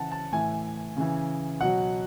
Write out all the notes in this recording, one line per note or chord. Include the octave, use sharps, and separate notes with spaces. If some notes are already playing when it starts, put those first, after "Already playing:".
Already playing: C#3 E3 F#5 A5
A5
A2 E3 G#5
C#3 E3
B2 F#3 F#5